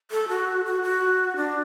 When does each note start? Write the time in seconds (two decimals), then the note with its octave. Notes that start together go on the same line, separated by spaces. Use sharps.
0.11 A4
0.29 F#4
0.65 F#4
0.82 F#4
1.36 D4